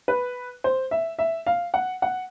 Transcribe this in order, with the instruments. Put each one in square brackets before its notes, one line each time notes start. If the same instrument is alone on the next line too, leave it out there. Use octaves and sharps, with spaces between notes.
[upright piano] B4
C5
E5
E5
F5
F#5
F#5